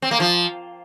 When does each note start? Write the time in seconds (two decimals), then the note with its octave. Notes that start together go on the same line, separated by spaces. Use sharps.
0.02 C4
0.11 A#3
0.20 F3